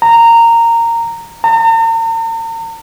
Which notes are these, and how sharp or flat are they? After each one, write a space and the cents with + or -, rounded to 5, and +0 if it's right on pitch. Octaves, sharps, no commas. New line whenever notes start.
A#5 -15
A#5 -45